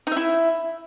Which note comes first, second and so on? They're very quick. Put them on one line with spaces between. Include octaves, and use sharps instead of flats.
D#4 E5 E4